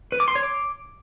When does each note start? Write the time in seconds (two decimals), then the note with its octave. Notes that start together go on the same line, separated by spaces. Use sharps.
0.12 B4
0.20 D6
0.28 C6
0.35 C#5
0.43 D6